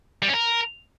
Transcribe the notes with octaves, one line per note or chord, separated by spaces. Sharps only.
G3
C#4
A#4